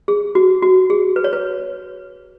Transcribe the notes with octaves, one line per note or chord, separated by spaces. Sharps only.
G#4
F#4
F#4
G#4
B4
C#5
B4